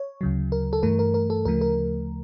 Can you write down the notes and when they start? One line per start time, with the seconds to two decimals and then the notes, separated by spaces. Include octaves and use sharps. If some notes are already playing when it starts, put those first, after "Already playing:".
Already playing: C#5
0.21 D2 C#3 F#3
0.52 A#4
0.73 A4
0.83 G2 E3 A3 A#4
0.99 A#4
1.14 A#4
1.30 A4
1.45 D2 C#3 F3 A3 A#4
1.61 A#4